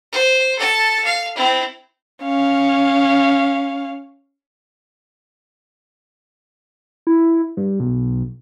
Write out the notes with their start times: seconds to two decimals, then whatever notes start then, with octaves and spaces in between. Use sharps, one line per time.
0.12 C5
0.59 A4 A5
1.05 F5
1.36 C4 E4
2.24 C#4 F5
7.07 E4
7.57 G2
7.80 B1